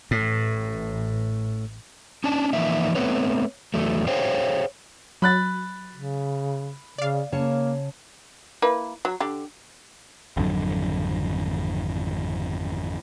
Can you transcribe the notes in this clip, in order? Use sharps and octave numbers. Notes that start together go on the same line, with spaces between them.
A1 A2
C#4 D4 A5
E3 F3 A#3 D#4 E5
A3 B3 C4 B4 C#5
E2 F#3 A3
G#4 C5 C#5 F5 G5
F#3 B5 F#6 A6
C#3
C#3 D5 F5
C#3 A#3 C#5 A5
A#3 E4 B4
F#3
D3 G4
G#1 F2 D3 F#3